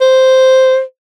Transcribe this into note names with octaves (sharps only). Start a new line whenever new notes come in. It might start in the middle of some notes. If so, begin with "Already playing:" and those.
C5